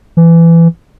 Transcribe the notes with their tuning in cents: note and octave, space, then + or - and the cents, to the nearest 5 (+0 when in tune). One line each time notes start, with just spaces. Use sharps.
E3 +20